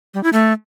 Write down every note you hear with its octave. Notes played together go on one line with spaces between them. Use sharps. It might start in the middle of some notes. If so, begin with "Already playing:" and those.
G3
E4
A3